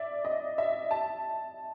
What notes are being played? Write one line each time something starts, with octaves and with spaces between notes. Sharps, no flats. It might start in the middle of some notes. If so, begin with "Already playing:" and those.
Already playing: D5 E5
D#5
E5
A5